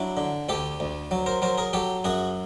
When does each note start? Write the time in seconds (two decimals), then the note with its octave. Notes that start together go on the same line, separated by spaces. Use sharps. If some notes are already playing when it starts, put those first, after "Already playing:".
Already playing: F#3 D4 E4
0.17 D3
0.49 D2 G4 A4
0.80 D2
1.11 F#3
1.26 A#4 C5
1.42 F#3 A#4 C5
1.58 G#4 A#4
1.73 F#3 G4 A4
2.04 F#2 F#4 G#4